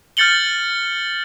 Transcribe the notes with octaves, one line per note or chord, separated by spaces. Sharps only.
F6 G6 A6 C#7 F#7 G7